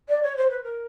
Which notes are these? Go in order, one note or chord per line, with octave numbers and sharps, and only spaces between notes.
D5
C#5
C5
B4
A#4